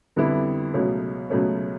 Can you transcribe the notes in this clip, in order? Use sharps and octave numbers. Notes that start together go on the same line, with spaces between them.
F2 D3 G3 B3 E4
C#2 B2 F#3 A3 C#4
C#2 B2 F#3 A3 C#4